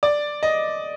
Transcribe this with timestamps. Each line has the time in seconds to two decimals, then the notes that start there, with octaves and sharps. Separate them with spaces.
0.03 D5
0.43 D#5